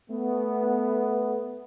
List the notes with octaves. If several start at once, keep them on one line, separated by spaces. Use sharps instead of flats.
A3 B3